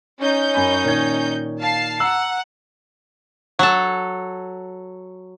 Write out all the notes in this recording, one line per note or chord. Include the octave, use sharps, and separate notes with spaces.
C#4 D#4 G6
F#2 G#5 B5
A#2 D#3 G#6
F5 A5 C7
F#5 A#5 E6 F#7
F#3 A4